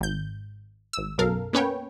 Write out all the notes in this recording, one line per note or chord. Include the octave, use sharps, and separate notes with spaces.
G#1 G6
G#1 E6
B1 F#2 B2 A4 A#4 F5
A#3 B3 C#4 B4 C#5 G5